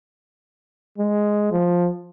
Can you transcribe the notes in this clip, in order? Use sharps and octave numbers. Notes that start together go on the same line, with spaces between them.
G#3
F3